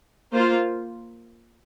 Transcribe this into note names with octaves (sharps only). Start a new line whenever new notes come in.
A#3 F4 C5